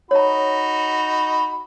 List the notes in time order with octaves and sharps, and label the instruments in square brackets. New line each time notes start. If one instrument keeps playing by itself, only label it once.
[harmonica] D#4 F#4 B5 [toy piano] C#5 A#5